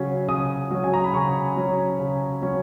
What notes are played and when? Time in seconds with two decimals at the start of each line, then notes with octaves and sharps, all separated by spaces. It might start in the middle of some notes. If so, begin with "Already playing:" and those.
Already playing: C#3 F#3 C#4
0.28 C#3 D#6
0.71 F#3 C#4
0.84 G#5
0.94 A#5
1.04 B5
1.13 C#3 C#6
1.56 F#3 C#4
1.99 C#3
2.42 F#3 C#4